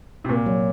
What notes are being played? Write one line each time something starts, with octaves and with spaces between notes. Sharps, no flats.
C3
A#2 F#4
F#3